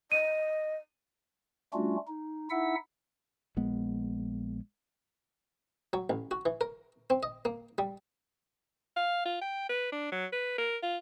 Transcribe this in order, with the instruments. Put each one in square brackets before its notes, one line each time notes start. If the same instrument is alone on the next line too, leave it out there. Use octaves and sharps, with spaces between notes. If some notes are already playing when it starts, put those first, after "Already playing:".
[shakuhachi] D#5 [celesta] D#7
[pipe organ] G3 A3 C#4 D4 F4 F#4
D#4
D#4 E4 E5 F#5 E6
[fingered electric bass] A#1 G#3 B3
[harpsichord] F#3
A1
F#4
E3
A#4
C4
D#5
A#3
G3
[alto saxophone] F5
F4
G5
B4
D4
F#3
B4
A#4
F4